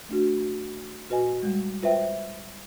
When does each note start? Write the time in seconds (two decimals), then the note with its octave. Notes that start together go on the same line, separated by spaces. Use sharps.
0.09 A3 D4 F#4
1.09 A#2 F#4 B4 D#5 G#5
1.43 G3 G#3
1.83 F4 B4 C5 E5 G5